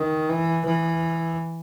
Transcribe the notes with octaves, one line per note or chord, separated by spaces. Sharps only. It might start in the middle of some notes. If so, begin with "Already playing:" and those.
Already playing: D#3
E3
E3